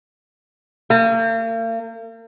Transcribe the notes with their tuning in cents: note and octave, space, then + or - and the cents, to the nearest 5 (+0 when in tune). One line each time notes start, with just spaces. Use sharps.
A#3 -45